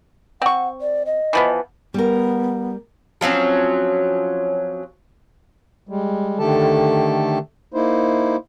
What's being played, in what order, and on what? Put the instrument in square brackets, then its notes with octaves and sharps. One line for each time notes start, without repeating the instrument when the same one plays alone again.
[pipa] C4 C#6 [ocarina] F#5
[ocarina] D5
D#5
[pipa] E3 F3 B3
[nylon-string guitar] G3 A#4 [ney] B3
[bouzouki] F3 F#3 C4 C#4
[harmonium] G3 G#3
D3 D#3 A3 G4 A4 A5
A#3 D#4 E4 C5